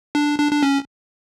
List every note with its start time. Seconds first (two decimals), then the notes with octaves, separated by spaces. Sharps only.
0.15 D4
0.39 D4
0.52 D4
0.63 C#4